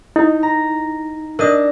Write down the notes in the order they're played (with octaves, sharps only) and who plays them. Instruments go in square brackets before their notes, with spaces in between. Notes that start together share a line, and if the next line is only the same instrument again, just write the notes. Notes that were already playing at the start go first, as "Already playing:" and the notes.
[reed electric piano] D#4 [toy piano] E4
[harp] A#5
[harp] D4 D#5 [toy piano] A#4 D5 D#6